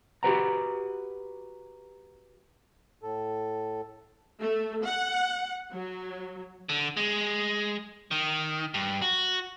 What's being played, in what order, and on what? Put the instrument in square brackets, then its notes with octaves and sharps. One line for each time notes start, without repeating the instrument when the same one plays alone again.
[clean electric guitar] F#4 G4 A4 B4 F#5 A#5
[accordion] A2 A4
[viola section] A3
F#5
F#3
[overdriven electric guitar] D3
G#3
D#3
G2
F#4